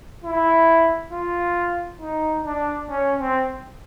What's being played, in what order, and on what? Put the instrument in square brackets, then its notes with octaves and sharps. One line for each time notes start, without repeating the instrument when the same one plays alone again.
[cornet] E4
F4
D#4
D4
C#4
C4